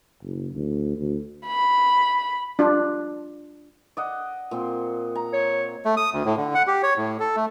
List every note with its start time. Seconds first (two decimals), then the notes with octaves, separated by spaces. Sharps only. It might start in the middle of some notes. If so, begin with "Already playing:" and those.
0.22 F#1
0.54 D2
0.98 D2
1.47 B5
2.59 D4 F4
3.97 D5 D#5 F#5
4.51 A#2 C4 C6
5.15 A#5
5.33 C#5
5.85 A3
5.97 D#6
6.13 D2
6.25 A2
6.37 D3
6.55 F#5
6.67 G4
6.83 C#5
6.97 A2
7.20 A4
7.36 A3